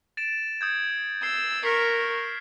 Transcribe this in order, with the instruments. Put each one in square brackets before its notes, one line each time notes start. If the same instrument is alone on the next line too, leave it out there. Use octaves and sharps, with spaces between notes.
[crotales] A6 D7 E7
D#6 G6 G#6
[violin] E6 [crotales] C7 G7
[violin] A#4 C#6 [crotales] F6 B6 C7